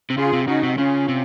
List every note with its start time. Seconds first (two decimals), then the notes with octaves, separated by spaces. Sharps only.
0.10 C3
0.17 C#3 F4 G#4
0.33 C3
0.48 C#3 D#4 F#4
0.63 C3
0.78 C#3 C#4 F4
1.08 C3